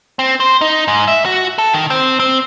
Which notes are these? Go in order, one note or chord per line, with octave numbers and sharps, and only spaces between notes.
C4
C5
D#4
G#2
E5
F#4
A4
D#3
C4
C4